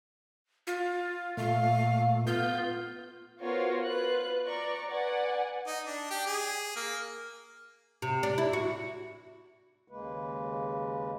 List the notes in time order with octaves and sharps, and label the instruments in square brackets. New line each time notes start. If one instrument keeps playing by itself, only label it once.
[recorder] F4
[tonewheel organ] A#2 A3 [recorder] F5
[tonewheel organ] B3 G6 [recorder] F4
[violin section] B3 F4 F#4 A#4 C5 C#5
F4 B4 F#6
D5 A#5 C#6
B4 D5 F#5 G#5
[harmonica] D#4
D4
G4
G#4
A#3
[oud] C3
D4
E4
F#4
[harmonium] D#2 C#3 G#3 A#3 B4